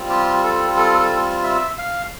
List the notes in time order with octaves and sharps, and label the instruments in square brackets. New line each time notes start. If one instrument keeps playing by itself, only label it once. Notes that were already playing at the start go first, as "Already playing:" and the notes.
Already playing: [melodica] G3 C4 F4
G4
A4
A4
A4
E5
F5